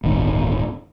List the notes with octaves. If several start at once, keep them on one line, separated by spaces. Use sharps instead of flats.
D1 G1 D#3